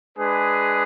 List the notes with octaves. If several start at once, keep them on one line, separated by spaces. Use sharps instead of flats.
G#3 D4 G#4 B4